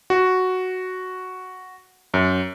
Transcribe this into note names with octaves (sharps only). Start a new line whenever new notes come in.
F#4
F#2